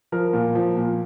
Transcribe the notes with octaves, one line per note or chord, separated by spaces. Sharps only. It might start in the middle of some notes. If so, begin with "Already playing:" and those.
F3 A#4
A#2
F3
A#2